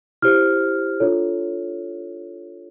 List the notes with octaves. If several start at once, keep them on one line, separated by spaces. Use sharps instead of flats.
E4 G4 C5 F6
D4 F4 A4 C#5